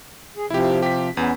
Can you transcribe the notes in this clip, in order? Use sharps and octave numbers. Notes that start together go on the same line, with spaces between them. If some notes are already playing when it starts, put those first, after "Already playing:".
G#4
C3 F3 E4 G4
G4 B6
E2 B3 C#4